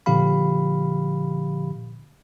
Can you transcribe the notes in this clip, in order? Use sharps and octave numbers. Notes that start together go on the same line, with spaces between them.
A#2 D3 F3 G4 F5 B5